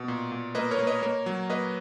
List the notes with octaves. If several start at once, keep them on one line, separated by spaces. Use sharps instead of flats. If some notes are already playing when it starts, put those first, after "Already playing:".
Already playing: B2
A#2
A#2
A#3 B4 D#5
A#4 C#5
A#3
B4 D#5
A#3 A#4 C#5
F#3
A#3 B4 D#5